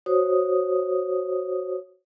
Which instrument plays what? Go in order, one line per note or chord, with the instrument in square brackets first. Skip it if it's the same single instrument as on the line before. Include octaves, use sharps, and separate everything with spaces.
[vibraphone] F#4 C5 C#5 D#6